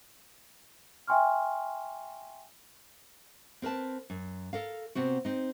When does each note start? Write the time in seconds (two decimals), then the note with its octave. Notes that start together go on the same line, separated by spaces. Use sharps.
1.07 E5 G5 G#5 C6 C#6 F6
3.62 C4 A#4 B4 A5
4.10 F#2
4.53 A4 A#4 F5
4.95 C3 B3 C4 F#4
5.25 C4 D#4